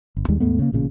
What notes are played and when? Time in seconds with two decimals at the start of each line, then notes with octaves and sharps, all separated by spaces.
0.17 G1
0.28 D#2 D#3 G3 G#3
0.40 D#2 G#2 A3 B3
0.59 C#3 A#3
0.72 A1 A#2 C#3